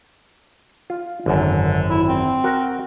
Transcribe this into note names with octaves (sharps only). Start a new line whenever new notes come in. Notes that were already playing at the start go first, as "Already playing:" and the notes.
F4
G#1 F#2 D3
E4
C4
F#4 A#4